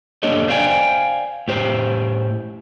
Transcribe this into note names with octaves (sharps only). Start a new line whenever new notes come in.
A#3 D4 G4 A4 C#5 D#5
C5 D5 F5 G5 G#5
A2 G4 C5